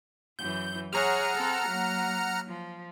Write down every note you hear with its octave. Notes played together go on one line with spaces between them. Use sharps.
F#2 E3 G6
G#4 C#5 F#5 A#5 F6
C4 A4
F#3 A#3
F3